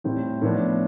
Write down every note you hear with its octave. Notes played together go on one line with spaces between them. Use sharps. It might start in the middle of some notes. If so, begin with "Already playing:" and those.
A2 G3 C4
A2 F3 B3 D4